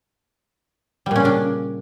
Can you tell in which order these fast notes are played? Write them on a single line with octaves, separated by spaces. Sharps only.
G3 A#2 C#4 C#3 D4